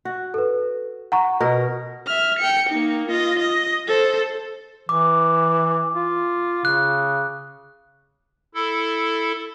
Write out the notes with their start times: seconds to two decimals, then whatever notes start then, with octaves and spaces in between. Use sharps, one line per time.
0.05 F#4
0.34 A4 B4
1.12 F#5 A#5 C#6
1.40 B2 A#4
2.06 E5 F6
2.39 G5 C#7
2.69 A#3 D#4
3.08 F4 D#5
3.39 D#5
3.87 A4 C5
4.89 E3 D6
5.95 F4
6.65 C#3 F#6
8.55 E4 A4